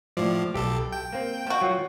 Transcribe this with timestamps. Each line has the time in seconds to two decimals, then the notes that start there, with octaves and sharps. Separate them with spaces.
0.17 A2 F3 D5
0.54 B1 G4 A4
0.92 G5
1.13 A#3 C4
1.47 F3 F#4
1.61 F#3 F4